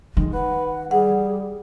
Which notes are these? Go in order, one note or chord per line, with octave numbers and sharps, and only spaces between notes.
D#3 G#3
B4 F#5
G3 G#4 F#5